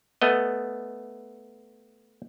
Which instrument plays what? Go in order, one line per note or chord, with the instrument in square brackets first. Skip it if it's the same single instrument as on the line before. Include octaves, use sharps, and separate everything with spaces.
[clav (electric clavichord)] A3 B3 D#5